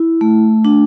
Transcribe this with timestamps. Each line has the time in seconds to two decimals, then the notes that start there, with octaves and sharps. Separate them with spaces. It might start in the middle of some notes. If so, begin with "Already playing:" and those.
Already playing: E4
0.21 A3
0.65 D4